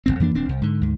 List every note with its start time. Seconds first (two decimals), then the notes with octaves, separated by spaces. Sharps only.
0.06 F#1 C#2 C4
0.20 F2 E3 A#3 D4
0.34 D#1 C4 D4
0.49 C2
0.61 G#2 D3
0.81 D2 G#2